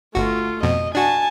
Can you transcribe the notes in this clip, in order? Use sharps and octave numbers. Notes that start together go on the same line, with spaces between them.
G1 A3 F4 F#4
F2 B2 D#5
D4 F#4 G#5 A5